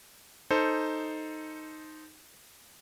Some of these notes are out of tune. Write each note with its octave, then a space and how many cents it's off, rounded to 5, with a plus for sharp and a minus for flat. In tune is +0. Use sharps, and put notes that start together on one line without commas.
D#4 +0 A4 +0 C5 +0